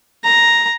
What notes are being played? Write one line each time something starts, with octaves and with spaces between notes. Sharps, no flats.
A#5